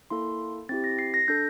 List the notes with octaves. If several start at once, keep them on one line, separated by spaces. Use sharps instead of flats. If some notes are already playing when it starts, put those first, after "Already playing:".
A#3 E4 A4 C6
C4 E4 G4 A6
A#6
C7
A#6
D4 A4 G6